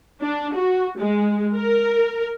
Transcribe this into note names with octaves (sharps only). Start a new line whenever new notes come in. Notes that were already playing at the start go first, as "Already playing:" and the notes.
D4
F#4
G#3
A#4